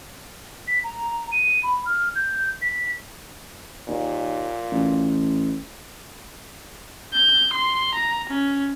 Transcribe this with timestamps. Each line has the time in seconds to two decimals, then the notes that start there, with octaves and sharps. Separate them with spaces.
0.68 B6
0.84 A#5
1.32 D#7
1.63 B5
1.86 F6
2.15 G6
2.62 B6
3.88 D#2 A#2
4.71 A1
7.14 G6
7.53 C6
7.94 A#5
8.29 C#4